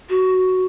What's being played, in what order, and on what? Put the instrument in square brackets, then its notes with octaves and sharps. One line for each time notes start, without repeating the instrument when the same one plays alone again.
[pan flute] F#4